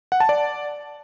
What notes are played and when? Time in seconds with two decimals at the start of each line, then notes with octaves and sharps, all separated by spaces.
0.12 F#5
0.20 A5
0.29 D5